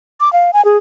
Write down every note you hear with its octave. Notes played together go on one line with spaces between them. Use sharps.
D6
F5
G#5
G#4